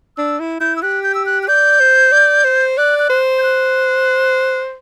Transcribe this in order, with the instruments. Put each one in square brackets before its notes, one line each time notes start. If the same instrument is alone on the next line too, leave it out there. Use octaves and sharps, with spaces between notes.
[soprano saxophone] D4 [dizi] E6
[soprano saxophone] E4
[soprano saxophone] E4 [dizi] G6
[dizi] E6
[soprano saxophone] G4 [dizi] F#6
[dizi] G6
E6
F#6
F#6
[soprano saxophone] D5 [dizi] G6
[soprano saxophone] C5
D5
C5
[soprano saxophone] D5 [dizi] F#6
[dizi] F#6
[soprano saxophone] C5
[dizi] G6
F#6